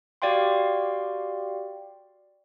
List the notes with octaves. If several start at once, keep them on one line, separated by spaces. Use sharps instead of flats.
F#4 G4 D5 F5 G5 C6